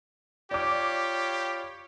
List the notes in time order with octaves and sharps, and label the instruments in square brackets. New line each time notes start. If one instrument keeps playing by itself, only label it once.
[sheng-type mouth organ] F4 C#5 B5 [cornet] G4 [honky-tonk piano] D5 D6